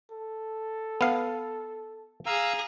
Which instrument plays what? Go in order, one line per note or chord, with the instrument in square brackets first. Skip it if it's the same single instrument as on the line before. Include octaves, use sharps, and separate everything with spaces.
[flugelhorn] A4
[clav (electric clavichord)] B3 F5
[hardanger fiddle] G#4 [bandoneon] F5 A#5 E6